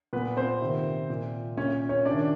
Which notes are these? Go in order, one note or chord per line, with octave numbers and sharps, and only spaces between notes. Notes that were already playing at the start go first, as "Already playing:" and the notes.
A#2 B3 B4
C4 C5
C3 D#3
A#2
A#2 C#4 C#5
C#4 C#5
C3 D#3 D4 D5